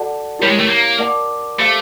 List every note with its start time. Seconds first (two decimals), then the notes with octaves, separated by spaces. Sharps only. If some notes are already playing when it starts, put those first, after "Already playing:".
Already playing: F#4 A4 D5 F#5 A5
0.39 G3 E4 G4 A#4 C#5
0.49 G#3
0.59 A3
0.69 A#3
0.99 A#4 D5 F#5 A5 D6
1.59 A3 G4 C5 F5 A5 D6